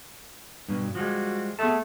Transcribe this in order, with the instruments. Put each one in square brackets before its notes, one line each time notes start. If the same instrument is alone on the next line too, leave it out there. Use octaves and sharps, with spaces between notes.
[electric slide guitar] G2 B2 F#3
[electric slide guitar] F3 G3 G#3 [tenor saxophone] F#4
[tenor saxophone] A3 [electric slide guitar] B3 G#4 A5